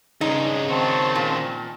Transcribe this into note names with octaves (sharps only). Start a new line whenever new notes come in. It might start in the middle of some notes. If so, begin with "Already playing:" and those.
G2 C#3 G#3 D#4
D#3 C4 F#4 A5
A#2